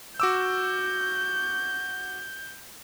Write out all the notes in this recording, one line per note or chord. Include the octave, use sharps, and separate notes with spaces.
F#4 D6 E6 G6